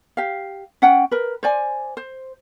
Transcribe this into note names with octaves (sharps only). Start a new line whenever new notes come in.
G4 F5
C#4 F#5 G5
A#4 B4
C5 D5 G#5
C5